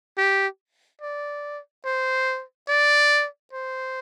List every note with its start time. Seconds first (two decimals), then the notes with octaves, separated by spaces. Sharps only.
0.18 G4
1.01 D5
1.85 C5
2.69 D5
3.53 C5